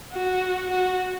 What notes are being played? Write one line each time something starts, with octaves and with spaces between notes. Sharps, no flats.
F#4
F#4